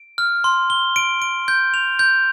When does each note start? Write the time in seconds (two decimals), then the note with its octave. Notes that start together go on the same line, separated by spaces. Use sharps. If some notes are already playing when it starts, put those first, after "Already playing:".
Already playing: D7
0.18 F6
0.44 C6
0.70 G7
0.96 D7
1.22 D7
1.48 G6
1.74 F7
1.99 G6